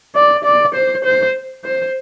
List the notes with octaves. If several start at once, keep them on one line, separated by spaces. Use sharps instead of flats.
D5
D5
C5
C5
C5